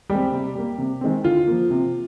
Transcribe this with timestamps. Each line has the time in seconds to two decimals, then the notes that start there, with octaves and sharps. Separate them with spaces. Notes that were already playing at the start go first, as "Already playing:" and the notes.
0.10 G3 G#3 C4 G4
0.32 C3
0.55 G3 A#3
0.78 C3
1.01 D#3 G#3 C4
1.24 D3 F4
1.47 F3 A#3
1.71 C3